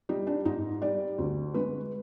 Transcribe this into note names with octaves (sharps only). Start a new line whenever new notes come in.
G3 D#4
D4
G#2 D#4
G3 D5
D2
D3 G#3 B4